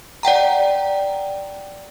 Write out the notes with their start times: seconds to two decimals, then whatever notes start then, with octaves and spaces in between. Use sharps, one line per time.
0.23 D5 F#5 G5 A#5